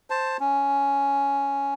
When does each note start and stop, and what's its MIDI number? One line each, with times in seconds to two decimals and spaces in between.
0.10 0.37 72
0.10 0.37 81
0.40 1.74 61